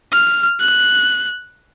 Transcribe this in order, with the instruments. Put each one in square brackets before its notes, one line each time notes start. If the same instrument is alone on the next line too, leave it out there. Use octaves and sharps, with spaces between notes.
[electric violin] F6
F#6